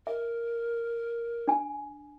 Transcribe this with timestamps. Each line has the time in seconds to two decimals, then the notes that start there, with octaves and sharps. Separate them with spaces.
0.07 A#4 E5
1.48 D4 G#5